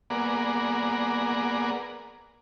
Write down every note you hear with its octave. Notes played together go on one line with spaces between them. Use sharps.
A#3 B3 G#4 D5 F#5 A#5